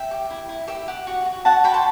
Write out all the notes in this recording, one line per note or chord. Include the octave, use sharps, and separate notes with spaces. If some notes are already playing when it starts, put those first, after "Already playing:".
Already playing: E5 G5
G4
E4
E4
G4 E5
G4 F#5
F#4
F#4
F#4 F#5 A5
F#4 G5 B5
A5 C6